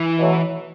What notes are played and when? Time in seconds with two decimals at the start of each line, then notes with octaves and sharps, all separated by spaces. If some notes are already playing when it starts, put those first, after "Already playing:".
Already playing: E3 E4
0.18 B2 F#3 A3